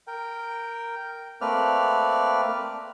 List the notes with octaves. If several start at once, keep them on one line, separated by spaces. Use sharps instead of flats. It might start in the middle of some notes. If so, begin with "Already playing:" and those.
A#4 G5
A3 A#3 C4 B4 D5 F6